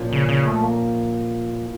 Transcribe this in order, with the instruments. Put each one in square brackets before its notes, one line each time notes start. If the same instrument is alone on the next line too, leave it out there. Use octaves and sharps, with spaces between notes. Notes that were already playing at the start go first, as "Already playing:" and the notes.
Already playing: [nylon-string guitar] A#2 F3 C#4 F4
[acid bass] C#3
C#3
A3
A#3